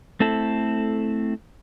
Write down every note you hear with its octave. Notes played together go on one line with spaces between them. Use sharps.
A3 C4 E4 A4